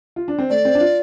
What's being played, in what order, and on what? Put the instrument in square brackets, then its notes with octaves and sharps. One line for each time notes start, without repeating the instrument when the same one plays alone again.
[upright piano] F4
D4
C4
[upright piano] A3 [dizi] D5
[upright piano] C4
D4
F4